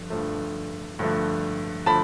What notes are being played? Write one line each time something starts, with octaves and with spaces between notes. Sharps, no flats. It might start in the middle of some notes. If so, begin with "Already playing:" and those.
Already playing: G2 D3 F3
G2 D3 F3 A3
G2 D3 F3 A3
D3 F3 A3 A5 B5